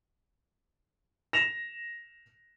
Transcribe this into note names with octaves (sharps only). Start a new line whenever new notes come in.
A#6 E7 F7